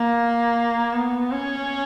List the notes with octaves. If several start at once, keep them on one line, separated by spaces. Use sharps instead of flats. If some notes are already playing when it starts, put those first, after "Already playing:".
Already playing: A#3
B3
C#4